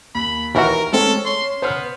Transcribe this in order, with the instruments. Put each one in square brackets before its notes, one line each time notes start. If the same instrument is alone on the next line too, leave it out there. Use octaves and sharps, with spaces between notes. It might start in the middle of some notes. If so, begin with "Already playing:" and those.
[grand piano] D#2 [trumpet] B5
[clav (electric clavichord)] D#2 E3 F#4 [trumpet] A#4 [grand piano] C#6 F6
[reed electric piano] G#3 A3 C4 [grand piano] C#4 [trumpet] A4
[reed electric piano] C#5 [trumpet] C6
[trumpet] B3 [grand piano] C5 F6